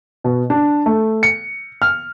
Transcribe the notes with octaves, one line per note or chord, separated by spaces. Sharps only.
B2
D4
A3
C#7
F6